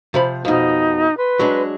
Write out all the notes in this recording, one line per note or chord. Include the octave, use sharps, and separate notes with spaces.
C3 F3 B5
F2 B2 D#4
B4 C6
F#3 G#3 D4